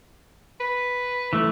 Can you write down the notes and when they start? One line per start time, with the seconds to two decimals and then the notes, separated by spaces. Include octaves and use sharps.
0.60 B4
1.33 E3 A3